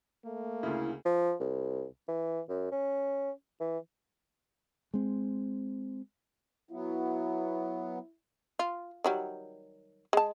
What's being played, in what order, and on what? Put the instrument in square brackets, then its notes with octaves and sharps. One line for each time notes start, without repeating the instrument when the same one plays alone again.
[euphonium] A3 [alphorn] A#3
[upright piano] D2 C#3 [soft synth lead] E4
[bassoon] F3
C2
E3
F#2
C#4
E3
[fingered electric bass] G#3 C4
[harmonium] F#3 B3 [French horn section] E4
[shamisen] F4
D#3 F#3 G3
G#3 A5